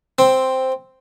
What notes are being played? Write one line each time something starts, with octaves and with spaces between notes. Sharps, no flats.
C4